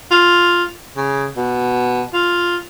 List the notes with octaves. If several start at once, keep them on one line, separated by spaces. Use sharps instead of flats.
F4
C#3
B2
F4